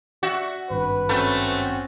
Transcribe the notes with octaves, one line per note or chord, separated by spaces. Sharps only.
F#4 D5 E5 F#5
G#1 G2 B4
A3 C4 C#4 F#4